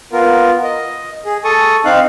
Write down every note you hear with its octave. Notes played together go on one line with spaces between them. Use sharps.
B3 F4 A#4
D#5
G#4
A4 C#6 D#6
C4 D#4 F5 F#6